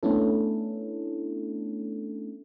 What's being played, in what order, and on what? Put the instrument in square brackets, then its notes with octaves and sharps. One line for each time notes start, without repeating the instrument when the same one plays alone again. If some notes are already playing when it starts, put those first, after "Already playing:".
[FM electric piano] A3 B3 C#4 D4 E4 A4